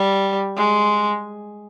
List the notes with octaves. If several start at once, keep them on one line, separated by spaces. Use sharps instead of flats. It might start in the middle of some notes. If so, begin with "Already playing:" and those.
Already playing: G3
G#3